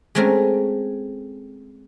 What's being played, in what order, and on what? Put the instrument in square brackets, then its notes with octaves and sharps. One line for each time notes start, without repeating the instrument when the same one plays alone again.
[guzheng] G#3 A3 C4 C#4 A#4